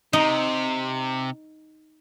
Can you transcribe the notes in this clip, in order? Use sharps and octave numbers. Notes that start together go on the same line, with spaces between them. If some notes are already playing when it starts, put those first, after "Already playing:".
C3 D#4